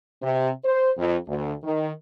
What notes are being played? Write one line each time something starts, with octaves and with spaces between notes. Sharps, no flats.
C3
C5
F2
D2
D#3